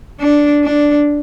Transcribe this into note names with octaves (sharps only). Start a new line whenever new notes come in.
D4
D4